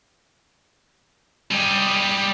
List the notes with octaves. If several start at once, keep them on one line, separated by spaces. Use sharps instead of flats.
G3 G#4